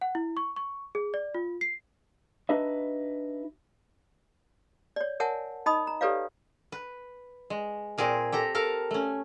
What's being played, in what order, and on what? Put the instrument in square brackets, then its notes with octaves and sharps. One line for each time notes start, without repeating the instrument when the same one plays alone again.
[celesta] F#5
E4
C#6
C#6
G#4
D5
F4
C7
[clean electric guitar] D4 D#4 F#4 B4 D#5 E5
[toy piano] C#5 D5
A#4 C#5 E5 F#5 G#5 A5
D#4 D#5 A5 B5 D#6
A#5
G4 A4 B4 C#5 D5 F5
[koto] B4
G#3
A#2 C4 G#4 A#4
G4 A4 A#5
A4 A#4 F5
A3 C#4